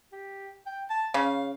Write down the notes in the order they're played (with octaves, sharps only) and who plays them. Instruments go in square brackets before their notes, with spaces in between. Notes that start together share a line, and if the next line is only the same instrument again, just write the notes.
[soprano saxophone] G4
G5
A5
[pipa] C#3 [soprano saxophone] F5